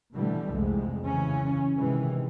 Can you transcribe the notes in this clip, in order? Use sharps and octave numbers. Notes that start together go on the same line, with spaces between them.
B2 D3 E3 G3 A3
C2 F2 C3 G#3
C#3 E3 C#4
C3 D#3 E3 G#3